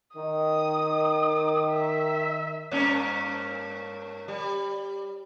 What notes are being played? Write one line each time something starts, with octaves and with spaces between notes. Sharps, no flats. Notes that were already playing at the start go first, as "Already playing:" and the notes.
D#3 D#6
E5
G2 A#3 C#4
G3